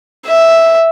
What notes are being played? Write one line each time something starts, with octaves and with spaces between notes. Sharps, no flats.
E5